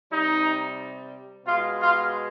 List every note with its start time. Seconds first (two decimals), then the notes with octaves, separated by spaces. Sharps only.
0.11 C3 G3 D#4
1.46 B2 G#3 F4
1.80 F4